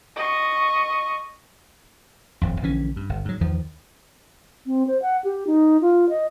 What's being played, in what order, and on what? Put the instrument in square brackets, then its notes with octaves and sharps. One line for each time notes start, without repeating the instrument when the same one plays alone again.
[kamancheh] D#5 C#6
[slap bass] D#1 G#1 F2
A#1 D3 E3 C#4
G2
G1
G#2 F#3
E2 D#3 F3
[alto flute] C4
C5
F#5
G4
D#4
F4
D#5